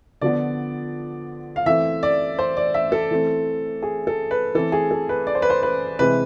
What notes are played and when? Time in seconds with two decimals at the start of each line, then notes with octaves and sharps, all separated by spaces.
0.21 D3 F3 B3 D5
1.56 F5
1.66 E3 A3 C4 E5
2.03 D5
2.39 C5
2.57 D5
2.74 E5
2.92 A4
3.11 E3 A3 C4
3.82 G#4
4.07 A4
4.31 B4
4.55 E3 A3 C4 A4
4.72 G#4
4.91 A4
5.09 B4
5.27 D5
5.35 C5
5.42 B4
5.50 C5
5.63 B4
5.99 C3 E3 G#3 C4 B4